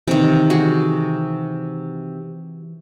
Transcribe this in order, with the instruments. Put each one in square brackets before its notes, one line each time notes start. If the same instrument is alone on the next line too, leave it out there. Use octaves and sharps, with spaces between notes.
[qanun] C3 D#3 [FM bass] E3
[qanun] F#4 G#4